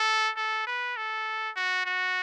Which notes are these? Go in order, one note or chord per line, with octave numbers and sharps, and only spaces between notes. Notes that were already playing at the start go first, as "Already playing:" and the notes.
Already playing: A4
A4
B4
A4
F#4
F#4